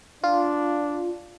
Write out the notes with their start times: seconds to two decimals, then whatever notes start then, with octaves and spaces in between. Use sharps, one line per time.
0.24 D4 F4